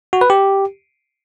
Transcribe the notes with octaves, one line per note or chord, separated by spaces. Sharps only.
F#4
B4
G4